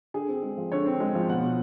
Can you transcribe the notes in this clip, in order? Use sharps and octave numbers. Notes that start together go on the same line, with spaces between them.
D3 G#4
C4
G#3
F3
D3 C#5
C4
G#3
F3
B2 F#5
B2